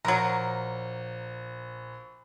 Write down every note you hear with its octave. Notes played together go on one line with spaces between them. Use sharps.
A#1 F#3 A#4